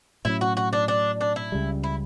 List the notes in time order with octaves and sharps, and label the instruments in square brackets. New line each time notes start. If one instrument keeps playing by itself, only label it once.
[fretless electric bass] A2 F#3 C#4 [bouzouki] E4
[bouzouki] F#4
F#4
D4
D4
D4
E4
[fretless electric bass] C#2 C#3 G3
[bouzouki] E4